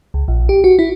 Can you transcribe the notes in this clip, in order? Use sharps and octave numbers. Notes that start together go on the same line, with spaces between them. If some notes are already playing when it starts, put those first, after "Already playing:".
C#2
A#1
G4
F#4
E4